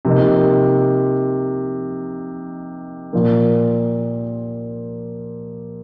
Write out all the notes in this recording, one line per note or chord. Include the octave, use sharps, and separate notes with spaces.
C3 F3 A#3 D#4
A#2 F3 A#3